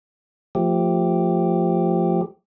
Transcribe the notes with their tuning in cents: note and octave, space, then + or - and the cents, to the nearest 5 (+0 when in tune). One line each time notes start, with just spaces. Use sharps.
F3 +0 A3 +20 G4 +0